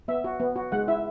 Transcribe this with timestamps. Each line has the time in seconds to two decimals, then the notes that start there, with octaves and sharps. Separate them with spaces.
0.08 B3 E5
0.24 F#4
0.40 B3
0.56 F#4
0.72 G#3 F#5
0.88 E4 E5